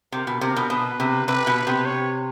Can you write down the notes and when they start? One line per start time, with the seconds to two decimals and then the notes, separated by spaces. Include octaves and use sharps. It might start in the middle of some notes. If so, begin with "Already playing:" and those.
0.12 C3 A#4
0.27 B2
0.41 C3 A#4
0.56 B2
0.70 B2 B4
1.00 C3
1.28 C3 B4
1.47 B2
1.67 C3
1.85 C#5